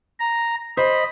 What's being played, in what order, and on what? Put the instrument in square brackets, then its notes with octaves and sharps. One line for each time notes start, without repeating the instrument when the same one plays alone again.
[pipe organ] A#5
[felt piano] C5 [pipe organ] D#5 B5